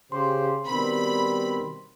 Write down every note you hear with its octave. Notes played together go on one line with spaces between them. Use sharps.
C#3 G4 C5 C6
B2 D#3 G3 C4 B5